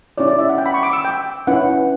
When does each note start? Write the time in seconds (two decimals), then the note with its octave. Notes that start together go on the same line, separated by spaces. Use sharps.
0.18 C#4 E4 G4 C#5 D5
0.28 D5
0.39 E5
0.49 F#5
0.58 G5
0.66 B5
0.74 C#6
0.83 D6
0.93 E6
1.05 G5
1.47 C#4 E4 B4 F#5